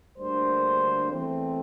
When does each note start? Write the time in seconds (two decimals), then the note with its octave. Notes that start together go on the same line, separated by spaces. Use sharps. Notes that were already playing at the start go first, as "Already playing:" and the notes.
0.17 D2 D3 G3 A#3 C5
1.10 E2 E3 A3 C4